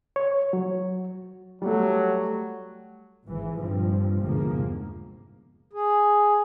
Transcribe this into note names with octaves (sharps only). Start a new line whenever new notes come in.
C#5
F#3
F#3 G3 A3
G#1 E3
G2 A#2 F3 C4
G1 E2 G#2 C3 F3 A#3
G#4